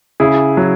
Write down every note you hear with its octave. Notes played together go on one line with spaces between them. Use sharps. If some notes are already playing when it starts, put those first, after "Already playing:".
C#3 E4 G#4
F#3